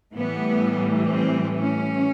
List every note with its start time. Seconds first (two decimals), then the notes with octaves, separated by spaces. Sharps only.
0.16 A2 E3 G3 B3
1.11 C4
1.58 C#4